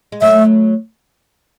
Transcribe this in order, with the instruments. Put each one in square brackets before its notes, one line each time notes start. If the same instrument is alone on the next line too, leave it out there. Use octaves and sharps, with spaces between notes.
[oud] G#3
[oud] F#3 A3 [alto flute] E5